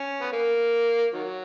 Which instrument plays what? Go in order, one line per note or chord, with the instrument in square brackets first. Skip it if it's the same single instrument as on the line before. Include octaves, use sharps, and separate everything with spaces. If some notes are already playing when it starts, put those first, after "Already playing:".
Already playing: [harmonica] C#4
B3
A#3
D#3 F#3